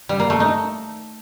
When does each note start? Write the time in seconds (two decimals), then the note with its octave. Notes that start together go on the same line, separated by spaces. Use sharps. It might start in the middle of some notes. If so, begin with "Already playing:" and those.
0.09 G3
0.20 A#3
0.30 A3
0.40 D#4